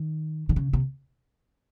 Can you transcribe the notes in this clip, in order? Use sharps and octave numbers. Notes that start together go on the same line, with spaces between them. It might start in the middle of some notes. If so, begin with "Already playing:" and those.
Already playing: D#3
D3
C#3
C3